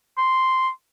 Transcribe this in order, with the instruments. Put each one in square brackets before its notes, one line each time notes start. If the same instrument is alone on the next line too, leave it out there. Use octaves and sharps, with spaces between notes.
[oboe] C6